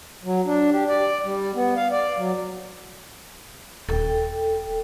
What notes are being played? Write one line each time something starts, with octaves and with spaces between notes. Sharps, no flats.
F#3
D4
G4
D5
G3
B3
F5
D5
F#3
D#1 A4 G5